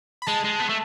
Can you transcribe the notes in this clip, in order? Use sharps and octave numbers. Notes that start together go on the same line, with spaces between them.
B5
G#3 A5
G#3
B3
A3